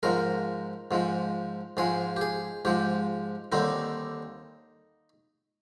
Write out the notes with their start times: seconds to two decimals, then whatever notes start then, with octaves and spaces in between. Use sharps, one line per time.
0.03 G#2 F3 G#3 A#4
0.91 G#2 F3 G#3
1.77 G#2 F3 G#3 G#4
2.16 G4
2.21 G#4
2.65 G#2 F3 G#3 G4
3.52 D#2 D3 G3 C4 D#4